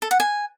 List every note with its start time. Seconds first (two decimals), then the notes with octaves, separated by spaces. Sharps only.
0.02 A4
0.11 F#5
0.20 G#5